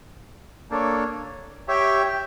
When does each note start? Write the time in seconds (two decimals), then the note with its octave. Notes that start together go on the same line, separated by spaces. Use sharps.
0.70 A#3 D4 A4 C#5
1.68 G4 C#5 E5 G5